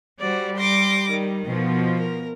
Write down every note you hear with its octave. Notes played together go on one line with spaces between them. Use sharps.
G3 F#4 C5 D5
C6 D6 A#6
D#3
B2 F3
A#4